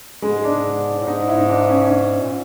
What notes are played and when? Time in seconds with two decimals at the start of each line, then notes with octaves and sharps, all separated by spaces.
0.22 G#2 G#3
0.44 D4
0.99 A2
1.06 G#2 D#4
1.27 E4
1.38 D#4
1.49 D4
1.69 C#4
1.85 D4
1.91 C#4
2.20 A#2